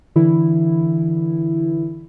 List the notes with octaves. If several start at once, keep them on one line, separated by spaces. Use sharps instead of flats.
D3 E3 E4